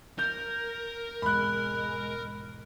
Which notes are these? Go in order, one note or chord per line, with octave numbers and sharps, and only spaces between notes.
A#4 G6
B1 E2 G#2 G#3 B5 F#6